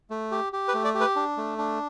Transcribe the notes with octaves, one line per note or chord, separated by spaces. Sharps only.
A3
G4
G4
B4
A3
D5
G4
B4
D4
A3
D4